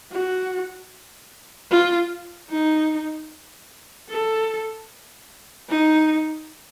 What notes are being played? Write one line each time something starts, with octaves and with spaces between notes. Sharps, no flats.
F#4
F4
D#4
A4
D#4